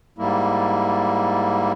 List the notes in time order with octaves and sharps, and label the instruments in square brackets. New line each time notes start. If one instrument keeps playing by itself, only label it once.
[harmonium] G#2 G3 A#3 E4